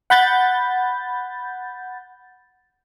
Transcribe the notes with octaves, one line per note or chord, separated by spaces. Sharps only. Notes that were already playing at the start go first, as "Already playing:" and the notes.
F#5 B5 G6 A6